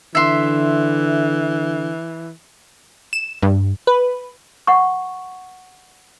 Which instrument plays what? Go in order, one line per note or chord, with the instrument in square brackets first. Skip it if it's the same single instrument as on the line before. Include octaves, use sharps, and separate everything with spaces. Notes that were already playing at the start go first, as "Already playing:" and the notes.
[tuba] D3 [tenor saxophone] E3 [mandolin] E5 C6
[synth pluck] E7
G2
[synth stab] B4
[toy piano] F#5 C#6